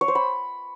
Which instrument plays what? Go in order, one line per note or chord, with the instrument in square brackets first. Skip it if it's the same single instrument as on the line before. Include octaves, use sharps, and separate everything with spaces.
[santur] C#5
C5
B5